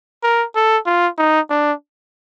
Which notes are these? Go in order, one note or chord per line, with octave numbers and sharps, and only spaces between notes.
A#4
A4
F4
D#4
D4